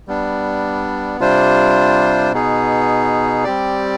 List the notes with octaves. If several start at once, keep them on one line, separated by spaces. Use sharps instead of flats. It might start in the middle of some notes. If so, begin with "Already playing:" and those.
G3 B3 D4
C3 G3 D4 F4 C5
B2 B3 D#4 G#4
G3 C4 G4 D5